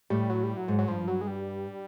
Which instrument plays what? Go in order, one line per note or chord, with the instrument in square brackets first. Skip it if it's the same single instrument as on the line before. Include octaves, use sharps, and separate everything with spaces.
[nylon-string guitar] A2 [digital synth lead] G3
[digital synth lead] F#3
G3
F#3
[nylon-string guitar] G#2
[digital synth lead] F#3
[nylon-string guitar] G2 [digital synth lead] F3
[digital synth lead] F#3
G#3
G3